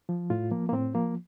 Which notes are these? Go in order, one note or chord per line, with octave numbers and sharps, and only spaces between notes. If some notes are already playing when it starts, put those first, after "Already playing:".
F3
A2 F4
F3 A#3
A#3
A2 C4
F3 A#3